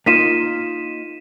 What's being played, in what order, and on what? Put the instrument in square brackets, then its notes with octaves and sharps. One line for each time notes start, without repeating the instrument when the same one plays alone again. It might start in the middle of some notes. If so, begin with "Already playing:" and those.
[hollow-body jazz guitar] A#3 D#4 F4 [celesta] B6 D#7 E7